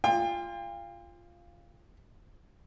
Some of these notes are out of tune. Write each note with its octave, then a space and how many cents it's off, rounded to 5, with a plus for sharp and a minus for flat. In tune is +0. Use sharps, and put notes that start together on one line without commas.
F4 -10 G5 +40